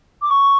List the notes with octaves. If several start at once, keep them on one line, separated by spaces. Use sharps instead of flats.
D6
C#6